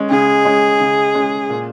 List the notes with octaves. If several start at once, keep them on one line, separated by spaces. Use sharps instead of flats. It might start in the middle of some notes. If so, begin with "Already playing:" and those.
Already playing: G#3 C#4
C#3 G#4
G#3 C#4
C#3
G#3 C#4
A#2